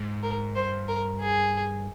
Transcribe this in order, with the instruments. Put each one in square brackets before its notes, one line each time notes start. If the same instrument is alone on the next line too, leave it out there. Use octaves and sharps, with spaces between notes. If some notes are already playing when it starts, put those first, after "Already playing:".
Already playing: [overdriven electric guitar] G#2
[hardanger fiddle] A#4
[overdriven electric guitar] G2 [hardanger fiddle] C5
[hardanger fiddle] A#4
G#4